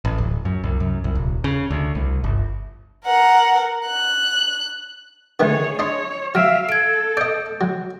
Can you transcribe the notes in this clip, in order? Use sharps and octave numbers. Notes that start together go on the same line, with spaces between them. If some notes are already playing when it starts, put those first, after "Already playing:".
A1
D1
F#2
C2
F#2
C2
D#1
C#3
D2
C2
G1
A#4 F#5
F#6
D3 D#3 A3 G#4 C#5
D4 C#5 D#5 C6
F#3 E5 F5 F6 D7
A4 G#6 D7
D5 D#5 G6 D7
F#3